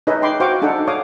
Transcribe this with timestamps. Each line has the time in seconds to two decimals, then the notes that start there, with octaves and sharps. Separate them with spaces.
0.07 D#4 G#4 B4 C#5 D#5 E5
0.22 G5 B5 C6 D6
0.40 F#4 C5 F5 G5 C#6 D6
0.62 D4 D#4 G#4 A4 F#5
0.88 C#5 F5 D6 D#6